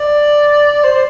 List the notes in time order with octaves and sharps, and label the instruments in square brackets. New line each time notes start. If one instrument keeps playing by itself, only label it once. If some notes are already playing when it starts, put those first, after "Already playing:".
Already playing: [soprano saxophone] D5
C5